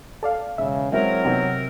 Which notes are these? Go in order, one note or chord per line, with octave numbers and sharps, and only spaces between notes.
A4 D5 F5
E1 C#3 E5
F#3 G#3 C4 E4 A#4
C3 B3 D#4 G4